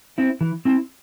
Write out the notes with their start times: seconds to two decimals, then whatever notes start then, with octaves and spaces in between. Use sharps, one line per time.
0.18 C4 E4
0.41 E3
0.65 C4 E4